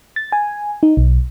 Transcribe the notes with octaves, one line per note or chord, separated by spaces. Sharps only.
A6
G#5
D#4
B1